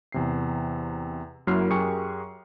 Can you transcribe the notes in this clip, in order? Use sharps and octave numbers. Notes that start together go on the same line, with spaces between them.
E2 C3 C7
F#2 F#3 A#3 E4 F6 C7
F#2 G4 G#4 A#4 C#6 C#7